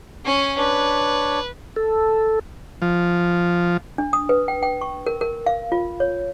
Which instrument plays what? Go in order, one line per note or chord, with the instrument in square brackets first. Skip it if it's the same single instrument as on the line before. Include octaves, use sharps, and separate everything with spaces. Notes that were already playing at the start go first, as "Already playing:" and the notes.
[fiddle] C#4 G#5
[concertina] D4 C#5 [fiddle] B4
[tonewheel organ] A4
[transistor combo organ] F3
[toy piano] D4
D#6
B4
G5
G5
C#6
A#4
A#4
F5
F4
C#5